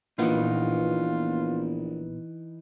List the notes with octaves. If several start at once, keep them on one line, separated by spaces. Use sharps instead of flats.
A#1 A#2 E3 B3 D#4 F4